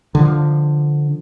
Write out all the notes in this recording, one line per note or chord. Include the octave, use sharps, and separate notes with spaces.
D3 F3